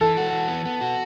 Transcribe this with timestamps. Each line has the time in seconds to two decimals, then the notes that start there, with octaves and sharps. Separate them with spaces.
0.01 E3 A4
0.17 F#4
0.33 E3
0.48 B3
0.65 B3
0.81 F#4